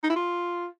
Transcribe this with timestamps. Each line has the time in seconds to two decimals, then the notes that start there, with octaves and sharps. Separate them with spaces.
0.03 D#4
0.10 E4
0.16 F4